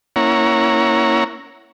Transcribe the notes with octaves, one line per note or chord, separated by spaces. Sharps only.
A#3 C#4 E4 C#5 F#5 A#5